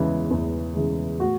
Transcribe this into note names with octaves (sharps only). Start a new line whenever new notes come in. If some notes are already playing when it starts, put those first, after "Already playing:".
Already playing: E2 C#3 E3 G#3
E2
C#3 E3 G#3
A2 F#4